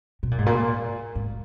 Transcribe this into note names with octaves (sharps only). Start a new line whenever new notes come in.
B2
A#2
G#2
A#2
G#2